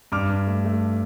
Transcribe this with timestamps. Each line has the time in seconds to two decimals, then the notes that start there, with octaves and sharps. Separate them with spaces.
0.12 G2 D6 F6
0.29 G2
0.47 A3
0.65 A3